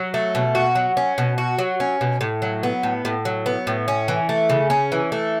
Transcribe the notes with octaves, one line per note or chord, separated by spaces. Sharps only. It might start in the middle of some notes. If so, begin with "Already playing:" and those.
Already playing: F#3
A3
B2
F#4
F#3
C#4
B2
F#4
F#3
C#4
B2
A2
F#3
B3
A2
A2
F#3
B3
A2
C#4
E3
A3
C#3
C#4
E3
A3